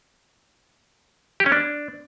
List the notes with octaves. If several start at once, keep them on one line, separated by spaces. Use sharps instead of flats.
G4
C#4
D4